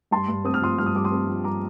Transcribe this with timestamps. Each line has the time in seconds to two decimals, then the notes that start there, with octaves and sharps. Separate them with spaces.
0.11 G2 A5 C6
0.28 G2
0.44 C4 D#6
0.54 F6
0.62 F3 C6 D#6
0.78 G2 F6
0.86 D#6
0.94 G2 D6
1.05 C6 D#6
1.12 C4
1.27 F3
1.44 G2 A#5 D6